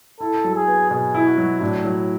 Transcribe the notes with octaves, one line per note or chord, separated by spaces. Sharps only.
E4 A4
F#3
G#4
B3
B2 G#4
E4
F#4
F#3
A2 D4
F#3